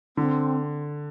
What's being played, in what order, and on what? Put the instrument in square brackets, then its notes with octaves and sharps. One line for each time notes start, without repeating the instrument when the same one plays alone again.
[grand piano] D3 [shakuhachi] C4